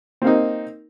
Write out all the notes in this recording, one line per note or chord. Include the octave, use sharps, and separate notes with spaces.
A#3 C4 D#4